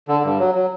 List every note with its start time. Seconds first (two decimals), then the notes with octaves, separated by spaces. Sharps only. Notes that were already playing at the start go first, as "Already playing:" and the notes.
0.08 D3
0.23 G2
0.39 F#3
0.55 F#3